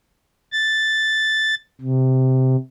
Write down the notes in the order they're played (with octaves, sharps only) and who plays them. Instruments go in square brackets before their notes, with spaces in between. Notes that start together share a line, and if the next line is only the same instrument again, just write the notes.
[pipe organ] A6
C3